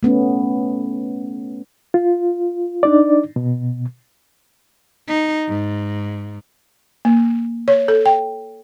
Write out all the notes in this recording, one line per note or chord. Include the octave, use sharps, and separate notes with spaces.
A3 B3 C#4
F4
D4 D#4 D5
B2
D#4
G#2
A#3
C#5
A4
G5